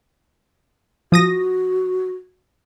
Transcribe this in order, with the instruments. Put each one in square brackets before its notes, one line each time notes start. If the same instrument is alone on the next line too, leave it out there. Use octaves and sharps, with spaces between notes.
[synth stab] F3 D#6 A#6 [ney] F#4